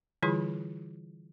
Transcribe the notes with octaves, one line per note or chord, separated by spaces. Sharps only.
D3 E3 G3 E4 F4 G#4